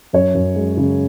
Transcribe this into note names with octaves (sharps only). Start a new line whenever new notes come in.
F#2 C#5
F#2
G#3
C#3